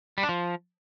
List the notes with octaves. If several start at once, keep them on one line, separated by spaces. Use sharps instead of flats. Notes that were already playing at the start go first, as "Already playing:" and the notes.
G3
D4
F3